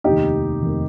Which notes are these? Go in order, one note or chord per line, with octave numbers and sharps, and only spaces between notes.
F1 D#2 D#3 D#4 G4
F1 D#3